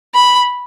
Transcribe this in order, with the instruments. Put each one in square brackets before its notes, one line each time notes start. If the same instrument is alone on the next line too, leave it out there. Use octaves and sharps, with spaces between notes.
[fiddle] B5